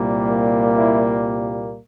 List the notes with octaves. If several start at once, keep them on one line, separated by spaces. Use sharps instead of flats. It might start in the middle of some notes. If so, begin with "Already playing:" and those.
Already playing: C2 A#2 G3 A#3
E4